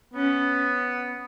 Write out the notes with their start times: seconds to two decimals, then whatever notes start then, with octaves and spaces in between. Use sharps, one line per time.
0.14 B3 C#4